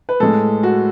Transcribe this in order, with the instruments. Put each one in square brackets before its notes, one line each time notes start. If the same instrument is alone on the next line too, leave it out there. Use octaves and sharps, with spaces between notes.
[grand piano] B4
A2 G#3 A4
F#4